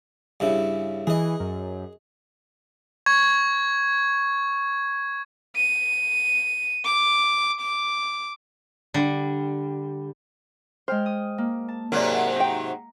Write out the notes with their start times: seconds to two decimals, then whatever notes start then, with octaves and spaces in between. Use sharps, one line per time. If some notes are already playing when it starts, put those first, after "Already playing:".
0.40 G2 C#3 E4
1.07 E3 G#4 D#5
1.40 F#2
3.06 C#6 G#6
5.56 D#7
6.85 D6
7.61 D6
8.94 D3 G3
10.88 G#3 C5 G5 F6
11.06 D#6
11.38 A#3
11.68 A5
11.92 G#2 C3 F#3 A#4 D5
12.36 D#4 G5 A#5